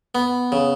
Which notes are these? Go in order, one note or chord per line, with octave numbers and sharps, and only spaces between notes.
B3
C#3